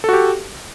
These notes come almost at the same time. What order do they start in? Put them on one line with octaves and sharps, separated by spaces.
A4 F#4 G4